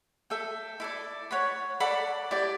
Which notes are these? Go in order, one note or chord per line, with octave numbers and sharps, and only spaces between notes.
A4 E5 G5
E4 A4 D5
C#5 F#5 B5
A4 D5 F#5 B5
E4 G4 D5